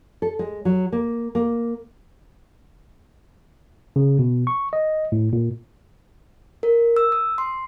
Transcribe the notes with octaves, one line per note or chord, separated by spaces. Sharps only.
A4
G#3
F#3
A#3
A#3
C#3
B2
C#6
D#5
A2
A#2
A#4
E6
D#6
C6